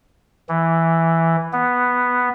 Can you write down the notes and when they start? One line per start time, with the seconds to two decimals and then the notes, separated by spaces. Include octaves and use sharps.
0.49 E3
1.53 B3